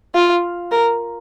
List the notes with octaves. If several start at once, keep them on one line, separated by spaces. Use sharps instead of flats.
F4
A#4